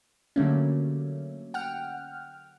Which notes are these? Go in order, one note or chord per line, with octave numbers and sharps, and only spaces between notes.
D3 F#3 G3 A3 A#3 C#4
F#5 G5 F6